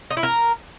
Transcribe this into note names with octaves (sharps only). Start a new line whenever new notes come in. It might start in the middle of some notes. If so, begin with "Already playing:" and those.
D#4
E4
A#4